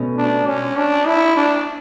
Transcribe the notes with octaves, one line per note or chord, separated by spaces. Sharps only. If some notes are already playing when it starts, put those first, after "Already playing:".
Already playing: B2 A3 C#4
D4
C#4
D4
E4
D4